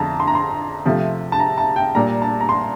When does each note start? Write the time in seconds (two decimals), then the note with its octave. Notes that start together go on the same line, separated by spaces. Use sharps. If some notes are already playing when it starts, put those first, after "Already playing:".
Already playing: F2 D3 F3 A5 A#5
0.20 C6
0.28 A#5
0.35 C6
0.85 C3 F3 A3
1.32 A5
1.40 A#5
1.58 A5
1.76 G5
1.95 A#2 G3 A#5
2.22 A5
2.41 A#5
2.49 C6